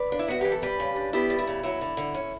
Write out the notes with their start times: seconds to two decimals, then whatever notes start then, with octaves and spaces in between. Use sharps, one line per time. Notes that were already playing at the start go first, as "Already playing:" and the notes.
Already playing: B4 D5
0.12 D4
0.19 E4
0.28 B3 F#4
0.41 E3 G4
0.52 A4
0.62 G3 G4 B4
0.80 C#3
0.96 D4
1.13 B3 E4 G4
1.30 G3
1.39 E4
1.47 C#3
1.63 F#3 E4
1.81 D3
1.97 D3
2.15 C#4